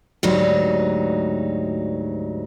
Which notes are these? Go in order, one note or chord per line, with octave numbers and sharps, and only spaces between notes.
D2 G#2 F#3 G3 D#4